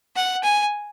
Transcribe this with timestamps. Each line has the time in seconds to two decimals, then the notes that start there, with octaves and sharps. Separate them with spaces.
0.16 F#5
0.44 G#5